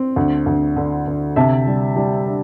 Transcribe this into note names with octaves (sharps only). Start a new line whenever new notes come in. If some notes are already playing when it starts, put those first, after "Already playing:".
Already playing: C4
D2
D2
D3
D3
C3 E5 A5
G3
G3
D4